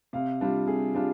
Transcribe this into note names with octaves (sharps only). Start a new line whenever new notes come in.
C3 F5
G3 D4 F4
C3 G#4
G3 D4 F4